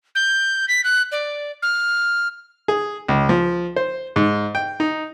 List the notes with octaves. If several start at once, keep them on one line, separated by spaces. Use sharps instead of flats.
G6
B6
F#6
D5
F6
G#4
C#2
F3
C5
G#2
G5
D#4